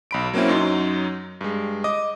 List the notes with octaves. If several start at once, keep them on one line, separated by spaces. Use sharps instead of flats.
B1 B5 D7
F#3 A#3 C4 C#4 E4
F#2 F#3 D#4 C6
G2 G#3
D#5 D6 D#6